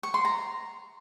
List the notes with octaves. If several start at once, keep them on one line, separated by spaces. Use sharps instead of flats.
C#6
C6
A#5